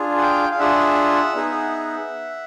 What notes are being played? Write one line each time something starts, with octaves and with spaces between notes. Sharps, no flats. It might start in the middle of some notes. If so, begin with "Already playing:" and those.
Already playing: D4 F4 G#4
F#5
F5 G5
F5
D4 F4 G#4 E5 F#5
B3 D#4 G#4